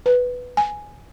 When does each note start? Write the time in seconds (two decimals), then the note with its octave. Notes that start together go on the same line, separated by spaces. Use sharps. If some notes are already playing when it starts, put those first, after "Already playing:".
0.06 B4
0.57 G#5